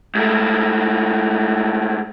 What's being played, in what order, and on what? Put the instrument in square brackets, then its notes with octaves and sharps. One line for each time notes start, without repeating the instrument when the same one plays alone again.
[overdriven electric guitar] G#2 A3